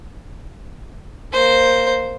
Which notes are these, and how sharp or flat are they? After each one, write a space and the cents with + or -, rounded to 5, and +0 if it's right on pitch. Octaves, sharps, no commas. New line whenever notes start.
A#3 +0 C5 +0